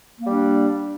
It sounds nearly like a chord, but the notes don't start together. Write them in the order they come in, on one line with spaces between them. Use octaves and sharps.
A#3 G3 D4